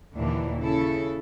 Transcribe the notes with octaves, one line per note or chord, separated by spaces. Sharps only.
D#2 A#2 D3 E3 D4
C#3 E4 A4